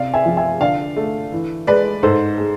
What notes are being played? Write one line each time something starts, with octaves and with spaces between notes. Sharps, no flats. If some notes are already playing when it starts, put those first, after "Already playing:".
Already playing: C3 D5 F5
E5 G#5
F3
E5 G#5
D3 D5 F5
A3
E3
G#3 B4 D5
G#2 A4 C5
G#3